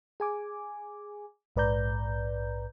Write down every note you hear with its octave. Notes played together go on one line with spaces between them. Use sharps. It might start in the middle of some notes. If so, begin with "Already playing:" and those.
G#4 G#5 D6
A#1 G#2 B4 D5 A#5 G6